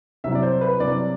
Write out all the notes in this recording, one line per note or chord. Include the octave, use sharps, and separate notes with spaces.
C2 C3 F#3 E5
D5
C5
B4
C2 C3 F#3 D5